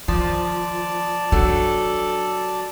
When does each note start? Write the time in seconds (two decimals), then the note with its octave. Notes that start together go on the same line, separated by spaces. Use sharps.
0.08 D#3 F3 D5 A5
1.32 F#3 D4 A4